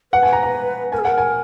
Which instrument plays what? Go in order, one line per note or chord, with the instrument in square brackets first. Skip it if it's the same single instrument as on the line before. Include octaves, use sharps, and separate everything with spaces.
[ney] B4 [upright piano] F#5
[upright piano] G#5
A#5
A#5
[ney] A#4 [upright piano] G#5
[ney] G#4
[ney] A#4 [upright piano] F#5
[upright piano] G#5